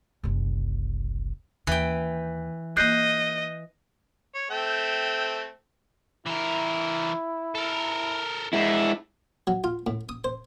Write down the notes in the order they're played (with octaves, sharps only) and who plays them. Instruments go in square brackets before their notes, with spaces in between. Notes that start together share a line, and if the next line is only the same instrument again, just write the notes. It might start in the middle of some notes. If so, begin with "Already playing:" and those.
[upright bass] F#1 C2
[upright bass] D#2 [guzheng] E3 G5
[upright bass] A#3 F4 [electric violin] D#5 [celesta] F#6 G6 C7
[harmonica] C#5
A3 C4 G5
[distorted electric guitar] E3 A#4 [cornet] E4
[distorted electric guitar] A4 A#4
[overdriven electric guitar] G#3 E4 [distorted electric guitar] A#4 E5
[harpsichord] F#3
F4
A2
D#6
C5